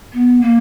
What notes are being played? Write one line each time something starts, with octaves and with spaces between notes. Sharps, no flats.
B3
A#3